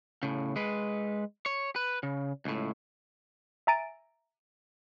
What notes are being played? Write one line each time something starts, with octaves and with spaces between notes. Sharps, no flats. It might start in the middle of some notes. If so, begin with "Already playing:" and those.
A2 C#3
G#3 B4
C#5
B4
C#3
C#2 A2
E5 G#5 A#5 A6 D7 D#7